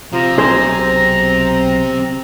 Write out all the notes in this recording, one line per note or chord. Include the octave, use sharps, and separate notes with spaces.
C3 F3 A#5
B1 C4 G#4 C5